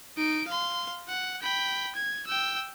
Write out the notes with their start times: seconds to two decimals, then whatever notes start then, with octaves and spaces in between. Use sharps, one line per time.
0.17 D#4 D7
0.48 F5 C6
1.08 F#5
1.42 G5 B5
1.95 G#6
2.27 G5 E6